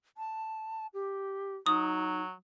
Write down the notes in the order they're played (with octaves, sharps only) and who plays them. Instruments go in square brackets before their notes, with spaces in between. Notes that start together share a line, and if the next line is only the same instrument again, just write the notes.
[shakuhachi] A5
G4
[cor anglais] F#3 [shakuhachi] D#4 [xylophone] D#6